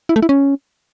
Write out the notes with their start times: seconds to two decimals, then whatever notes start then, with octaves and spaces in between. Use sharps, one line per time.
0.09 E4
0.16 A3
0.22 E4
0.29 C#4